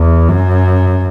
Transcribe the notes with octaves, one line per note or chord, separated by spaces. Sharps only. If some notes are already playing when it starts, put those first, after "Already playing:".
Already playing: E2
F#2